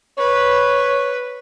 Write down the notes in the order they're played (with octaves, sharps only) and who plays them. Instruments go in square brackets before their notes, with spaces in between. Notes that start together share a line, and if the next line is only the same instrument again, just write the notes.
[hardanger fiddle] B4 [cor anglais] C#5